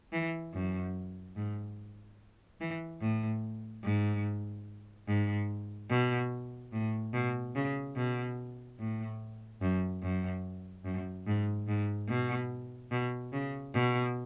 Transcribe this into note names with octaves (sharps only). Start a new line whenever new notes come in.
E3
F#2
G#2
E3
A2
G#2
G#2
B2
A2
B2
C#3
B2
A2
F#2
F#2
F#2
G#2
G#2
B2
B2
C#3
B2